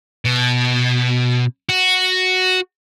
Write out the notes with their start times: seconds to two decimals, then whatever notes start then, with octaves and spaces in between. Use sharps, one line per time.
0.25 B2
1.69 F#4